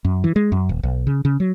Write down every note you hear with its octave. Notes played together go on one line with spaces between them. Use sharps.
F#2
E3
G#3
F#2
D#1
B1
C#3
C#3
F#3